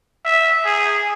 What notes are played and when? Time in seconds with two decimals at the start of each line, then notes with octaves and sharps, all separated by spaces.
0.25 E5
0.65 G#4